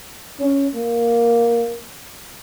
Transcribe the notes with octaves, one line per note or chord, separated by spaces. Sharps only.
C#4
A#3